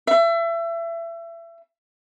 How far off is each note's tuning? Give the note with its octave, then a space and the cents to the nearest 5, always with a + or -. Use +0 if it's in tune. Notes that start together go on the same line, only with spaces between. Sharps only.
E5 +30